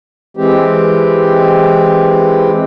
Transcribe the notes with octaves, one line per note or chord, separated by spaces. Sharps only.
E3 G#3 C4 G4